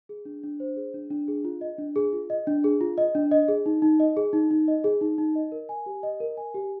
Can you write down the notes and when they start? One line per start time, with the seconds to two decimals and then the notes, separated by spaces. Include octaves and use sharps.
0.09 G#4
0.25 D4
0.43 D4
0.60 C5
0.77 G#4
0.94 D4
1.11 D4
1.28 G#4
1.45 F4
1.61 D#5
1.78 D4
1.96 G#4
2.13 F4
2.30 D#5
2.47 D4
2.64 G#4
2.81 F4
2.98 D#5
3.15 D4
3.31 D#5
3.48 G#4
3.66 D#4
3.82 D#4
4.00 D#5
4.17 G#4
4.33 D#4
4.51 D#4
4.68 D#5
4.84 G#4
5.01 D#4
5.18 D#4
5.35 D#5
5.52 A#4
5.69 G#5
5.86 G4
6.03 D#5
6.20 A#4
6.37 G#5
6.55 G4